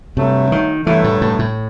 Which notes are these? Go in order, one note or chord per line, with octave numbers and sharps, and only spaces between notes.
G2 C3 F#3 A3
D#3
G2 E3 F#3 A3
A2
A2
A2